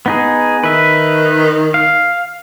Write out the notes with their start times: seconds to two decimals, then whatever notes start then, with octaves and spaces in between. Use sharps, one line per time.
0.06 B3 D#4 G#4
0.64 D#3 B4 E5
1.74 F5